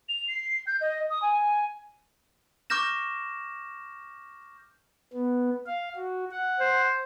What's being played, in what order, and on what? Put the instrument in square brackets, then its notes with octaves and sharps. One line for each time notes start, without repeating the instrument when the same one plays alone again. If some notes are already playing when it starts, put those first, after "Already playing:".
[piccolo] F7
C7
G6
D#5
D#6
G#5
[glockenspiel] C#6 D6 F6 G6 A#6 E7
[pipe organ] B3
F5
F#4
F#5
[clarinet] C5